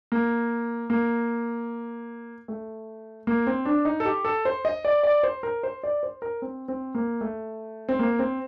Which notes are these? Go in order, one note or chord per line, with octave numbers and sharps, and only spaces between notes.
A#3
A#3
A3
A#3
C4
D4
D#4
A4
G4
A4
C5
D#5
D5
D5
C5
A#4
C5
D5
C5
A#4
C4
C4
A#3
A3
C4
A#3
C4